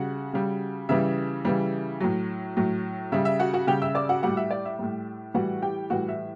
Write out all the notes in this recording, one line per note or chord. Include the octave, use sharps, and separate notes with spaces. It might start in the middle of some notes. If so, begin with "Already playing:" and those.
Already playing: C#3 G3 F#4 F#5
C#3 G3
C#3 E3 G3 E5
C#3 E3 G3
A2 F#3
A2 F#3
C#3 G3 E5
E5
F#4 F#5
F#4 F#5
C#3 G3 G4 G5
E5 E6
D5 D6
F#4 F#5
A2 G3 F#4 F#5
E5
D5
E5
A2 G3
A2 E3 G3 F#4 F#5
G4 G5
A2 E3 G3 F#4 F#5
E5